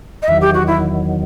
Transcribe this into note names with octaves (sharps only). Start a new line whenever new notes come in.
D#5
E2 D#3 F#3 E5
G4
F#4
E4